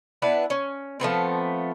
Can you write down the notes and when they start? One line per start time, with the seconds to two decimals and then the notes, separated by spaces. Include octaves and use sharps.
0.22 B3 D4 E4 B4
0.50 C#4
1.00 F3 A3 B3 C4